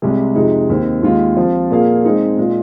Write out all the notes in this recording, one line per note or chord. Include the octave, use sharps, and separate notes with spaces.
C2 C3 G#3
F2 C3 G#3 D#4 G#4
D#2 D#3 C4
D#2 D#3 G#3 F4
F3 C4 F4 C5
A#2 A#3 G#4 F5
G#3 C4 D#4 G#4
A#2 G#3 F4